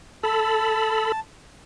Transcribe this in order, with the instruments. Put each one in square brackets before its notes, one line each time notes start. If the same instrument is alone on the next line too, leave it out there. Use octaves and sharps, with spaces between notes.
[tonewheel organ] A4 B5 [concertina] A5